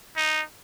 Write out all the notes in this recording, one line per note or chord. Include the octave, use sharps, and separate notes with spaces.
D#4